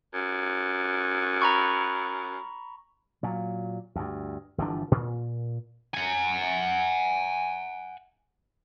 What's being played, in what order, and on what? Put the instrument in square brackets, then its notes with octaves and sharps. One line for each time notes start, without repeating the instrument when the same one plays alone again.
[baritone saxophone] F#2
[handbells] A#5 B5 C#6
[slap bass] A#2 F#3
D2 G2
G1 E3 F3 D4
A#2
[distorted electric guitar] F#5 G#5